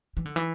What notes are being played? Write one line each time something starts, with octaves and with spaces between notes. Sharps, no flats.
E3
D3
E3